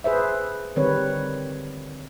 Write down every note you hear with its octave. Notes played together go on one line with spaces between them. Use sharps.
G#4 B4 C5 E5
D3 D#3 G3 C4 B4 C#5